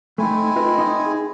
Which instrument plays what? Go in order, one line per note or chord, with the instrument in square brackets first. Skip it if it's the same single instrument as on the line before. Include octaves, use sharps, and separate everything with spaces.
[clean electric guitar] A3 D#4 [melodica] C4 E4 G#5
[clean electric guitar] F4 B4 D#5
D#4 D#5
G#4